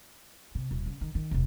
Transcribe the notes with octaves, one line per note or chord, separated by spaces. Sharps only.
C3
D#1
C#3
D#3
D#3
E1 C2